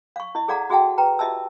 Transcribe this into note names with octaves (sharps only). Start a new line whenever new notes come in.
F5 C#6
E4 D#5
G#4 A4 D5 F5 F#5 A#5
F#4 G#4 E5 F#5 G5 A5
B4 G5 A#5
F4 G4 D#5 E5 A5 E6